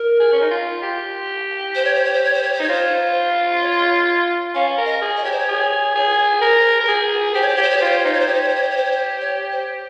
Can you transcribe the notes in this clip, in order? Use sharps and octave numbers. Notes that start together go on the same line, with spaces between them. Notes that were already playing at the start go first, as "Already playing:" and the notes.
Already playing: A#4
G#4
C#4
D#4
F4
G4
C5
C#5
C5
C#5
C5
C#5
C5
C#5
C5
D#4 C#5
F4 C5
C#5
C#4 F5
A#4
D#5
G#4
D#5
G4 C#5
C5
C#5
G#4
G#4
A#4
A#4
G#4
G4 C5
C#5
C5
G4 C#5
C5
C#5
C5
F4 C#5
C5
C#5
D#4 C5
C#5
C5
G4 C#5
C5
C#5
C5
C#5
C5
C#5
C5
C#5
C5
C#5
C5